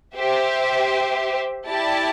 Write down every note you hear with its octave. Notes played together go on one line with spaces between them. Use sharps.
G4 C5 E5
E4 G4 D5 A5